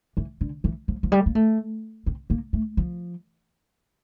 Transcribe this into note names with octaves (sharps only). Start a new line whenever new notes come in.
E3
D3
E3
F3
F3
G3
A#3
A3
C4
A#3
A3
F3